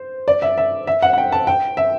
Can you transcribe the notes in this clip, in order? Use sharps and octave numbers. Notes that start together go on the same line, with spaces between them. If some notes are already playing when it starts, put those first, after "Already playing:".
Already playing: C5
D5
E5
E5
E5
F#5
F#5
G5
A5
G5
E5